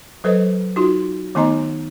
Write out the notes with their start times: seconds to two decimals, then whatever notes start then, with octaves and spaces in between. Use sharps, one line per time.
0.24 F#3 A4 B4 C5 D#5
0.76 D#4 F4 F#4 C6
1.35 D#3 A3 B3 D#4 D#5 A#5